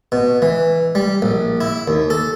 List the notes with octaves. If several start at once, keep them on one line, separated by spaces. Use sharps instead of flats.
B2
E3
G3
A#1
E4
D#2
A4